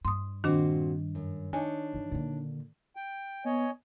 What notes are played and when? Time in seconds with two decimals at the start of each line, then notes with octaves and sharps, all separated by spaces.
0.05 G2 C6 D#6
0.44 A#2 D#3 C4 D4 F#4
1.15 F#2
1.53 D4 D#4 C#5 G#5
1.93 G2 E3
2.11 A#2 D3
2.96 G5
3.45 B3 C#5 D#5 G#5